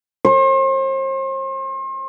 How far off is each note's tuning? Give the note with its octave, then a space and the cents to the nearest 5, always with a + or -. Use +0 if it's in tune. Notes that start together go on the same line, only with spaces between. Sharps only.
C5 +40